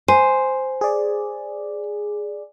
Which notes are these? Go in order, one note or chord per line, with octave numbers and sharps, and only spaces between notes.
C5 G#5
G#4 D5